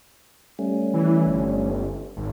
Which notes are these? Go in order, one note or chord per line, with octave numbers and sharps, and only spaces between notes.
G3 A3 C#4
E3
G1
G#1